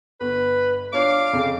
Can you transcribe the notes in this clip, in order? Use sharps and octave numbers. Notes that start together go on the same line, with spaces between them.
G1 B4
D4 F4 C#5 F5 D6
F2 C#3